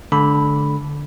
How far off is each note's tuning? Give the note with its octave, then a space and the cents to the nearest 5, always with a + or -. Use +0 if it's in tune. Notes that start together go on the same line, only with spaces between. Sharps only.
D3 -10 G#3 +45 B5 +0